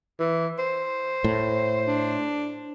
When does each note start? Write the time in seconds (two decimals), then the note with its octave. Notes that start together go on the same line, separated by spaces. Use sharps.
0.19 E3
0.59 C5
1.24 A2
1.87 D4